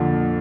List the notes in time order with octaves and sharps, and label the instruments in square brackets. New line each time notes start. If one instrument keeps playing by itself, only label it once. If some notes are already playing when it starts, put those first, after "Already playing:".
Already playing: [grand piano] F2 A#2 [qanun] D3